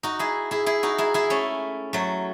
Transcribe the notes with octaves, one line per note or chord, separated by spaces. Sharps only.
D#4 F#4
E4 G#4
E4 G#4
E4 G#4
D#4 F#4
E4 G#4
E4 G#4
A3 C#4
F#3 A3